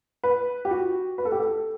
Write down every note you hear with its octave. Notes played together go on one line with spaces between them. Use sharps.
B4
G4
F#4
B4
A4
G4
A4